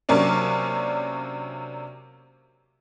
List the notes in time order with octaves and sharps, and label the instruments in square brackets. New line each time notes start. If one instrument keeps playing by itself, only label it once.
[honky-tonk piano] C3 F#3 A#3 C#4 D4